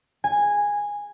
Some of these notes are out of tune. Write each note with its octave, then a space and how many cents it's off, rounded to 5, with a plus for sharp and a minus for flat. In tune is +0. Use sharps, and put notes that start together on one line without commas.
G#5 -10